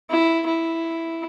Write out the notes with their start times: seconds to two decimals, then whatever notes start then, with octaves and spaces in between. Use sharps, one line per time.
0.09 E4
0.46 E4